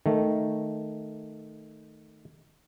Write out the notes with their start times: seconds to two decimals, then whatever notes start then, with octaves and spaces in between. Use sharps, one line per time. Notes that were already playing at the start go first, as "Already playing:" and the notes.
0.06 D#3 A3